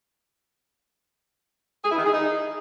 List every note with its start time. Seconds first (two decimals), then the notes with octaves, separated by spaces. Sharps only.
1.84 G#4
1.91 E4
1.98 D#3
2.05 G#4
2.12 D#4